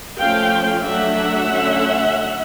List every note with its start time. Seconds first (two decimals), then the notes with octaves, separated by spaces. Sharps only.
0.18 F3 A3 C#4 F5 G5
0.84 F#3 A3 D4 E5 F#5
1.50 D3 F#3 A3 C#4